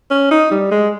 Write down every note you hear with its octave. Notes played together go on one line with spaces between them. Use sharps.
C#4
D#4
G3
G#3